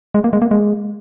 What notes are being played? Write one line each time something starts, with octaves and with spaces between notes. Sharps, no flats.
G#3
A#3
G#3
A#3
G#3